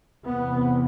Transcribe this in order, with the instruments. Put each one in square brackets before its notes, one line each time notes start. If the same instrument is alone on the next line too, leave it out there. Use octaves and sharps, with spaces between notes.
[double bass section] E2 C3 B3